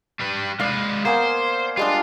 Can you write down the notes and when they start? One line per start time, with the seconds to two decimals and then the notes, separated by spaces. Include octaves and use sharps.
0.19 G3 B4
0.60 G#3 B4 D5 F5
1.05 A#3 B3 C5 G#5
1.77 G3 G#3 D4 F4